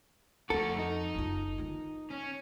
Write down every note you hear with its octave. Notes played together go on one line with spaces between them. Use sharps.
F2 A3 F#4 A4
D#4
F#1 F4
D#3 F4
C#4